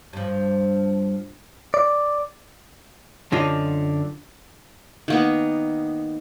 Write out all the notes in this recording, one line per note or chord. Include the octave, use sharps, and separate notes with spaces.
G2 F3
D5
F#2 D3 F4 D#5
D#3 A#3 B3